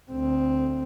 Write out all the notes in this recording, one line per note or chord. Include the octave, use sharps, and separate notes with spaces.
D2 C4